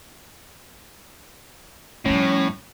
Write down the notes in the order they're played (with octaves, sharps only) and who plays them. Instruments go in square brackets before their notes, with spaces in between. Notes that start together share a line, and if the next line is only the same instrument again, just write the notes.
[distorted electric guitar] A2 [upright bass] F3 G3 [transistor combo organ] C#4